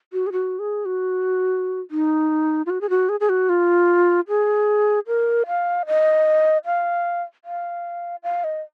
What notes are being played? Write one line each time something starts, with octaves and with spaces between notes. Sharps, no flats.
F#4
G#4
F#4
G#4
F#4
D#4
F4
F#4
G#4
F#4
G#4
G#4
F#4
F4
G#4
A#4
F5
D#5
F5
F5
F5
D#5